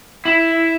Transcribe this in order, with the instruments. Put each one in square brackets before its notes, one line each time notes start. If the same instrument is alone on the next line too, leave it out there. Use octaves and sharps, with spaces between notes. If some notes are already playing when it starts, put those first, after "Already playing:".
[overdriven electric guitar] E4